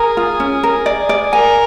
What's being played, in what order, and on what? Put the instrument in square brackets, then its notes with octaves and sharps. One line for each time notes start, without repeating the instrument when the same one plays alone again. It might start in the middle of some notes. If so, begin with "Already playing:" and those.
Already playing: [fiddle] G#4 [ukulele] A#4
[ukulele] F4
C#4
A#4
D5
D5
[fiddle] A#4 [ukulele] G#5